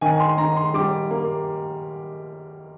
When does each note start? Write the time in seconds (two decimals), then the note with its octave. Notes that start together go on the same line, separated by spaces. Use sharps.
0.01 D#3 G#5
0.20 C6
0.37 D#3 A#5
0.57 C6
0.74 G3 D6
1.11 A#3